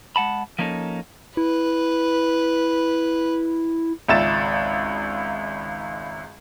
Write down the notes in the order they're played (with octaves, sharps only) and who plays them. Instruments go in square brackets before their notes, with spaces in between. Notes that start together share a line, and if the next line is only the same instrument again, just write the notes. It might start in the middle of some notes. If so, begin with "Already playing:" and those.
[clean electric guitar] G#3 F#5 A5 B5
F3 A#3 C#4 D#4 A4
[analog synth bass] E4 [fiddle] B4
[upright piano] G#1 C#2 E5 A6 E7